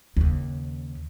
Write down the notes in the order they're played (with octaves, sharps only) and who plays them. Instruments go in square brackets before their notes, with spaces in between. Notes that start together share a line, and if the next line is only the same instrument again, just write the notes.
[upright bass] D#2 C#3